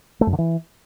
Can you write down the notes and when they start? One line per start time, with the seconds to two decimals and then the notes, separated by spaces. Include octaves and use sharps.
0.21 A3
0.27 F#2
0.33 D3
0.38 E3